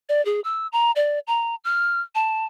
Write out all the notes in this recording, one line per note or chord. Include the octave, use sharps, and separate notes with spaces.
D5
G#4
E6
A#5
D5
A#5
F6
A5